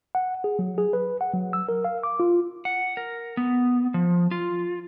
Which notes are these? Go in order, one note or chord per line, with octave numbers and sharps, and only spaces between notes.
F#5
G#4
F#3
G#4
B4
F#5
F#3
E6
A#4
F5
D6
F4
F#5
A#4
B3
F3
F4